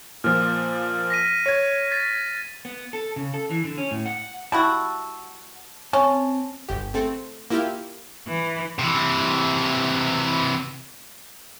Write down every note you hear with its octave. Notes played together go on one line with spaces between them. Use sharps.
A#2 F3 F6
A#6 B6 D#7
C#5 G#6
A6 B6
B3
A4
C#3
A4
E3
D3
C#4
A2
F#5
G3 E4 F#4 A5 E6
C4 C#4 A5
G1 G4
A3 C4 A4
A#3 E4 F4 G4 F5
E3
C3 E3